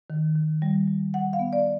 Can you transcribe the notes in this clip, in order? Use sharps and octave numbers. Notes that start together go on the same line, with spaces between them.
D#3
D#3
G3
G3
G3 F#5
F5
B3
D5